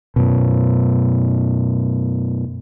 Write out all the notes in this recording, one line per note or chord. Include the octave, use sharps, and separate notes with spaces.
F#2 B2